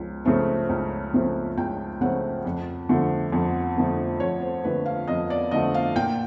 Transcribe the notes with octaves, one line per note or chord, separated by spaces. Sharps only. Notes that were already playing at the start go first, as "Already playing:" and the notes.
Already playing: C#2 F3
C#3 F3 A3 C4
C#2
C#3 F3 A3 C4
C#2 G5
C#3 F3 A3 C4 F#5
F2
D3 F3 A3
F2
D3 F3 A3
F2 C#5
C5
D3 F3 A3 B4
F5
F2 D#5
D5
D3 F3 A3 D#5
F5
A#2 G5